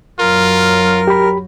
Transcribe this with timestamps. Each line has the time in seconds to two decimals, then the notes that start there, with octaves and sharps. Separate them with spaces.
0.19 F#2 F#3 F4 A#4
1.07 G4 B5